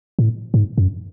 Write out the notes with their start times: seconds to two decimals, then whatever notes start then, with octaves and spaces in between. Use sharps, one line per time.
0.19 A2
0.54 G#2
0.78 F#2